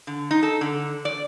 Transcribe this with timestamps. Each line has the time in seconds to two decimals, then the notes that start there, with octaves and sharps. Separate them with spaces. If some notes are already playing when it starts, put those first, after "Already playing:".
0.07 D3
0.31 D#4
0.43 A4
0.61 D3
1.05 D5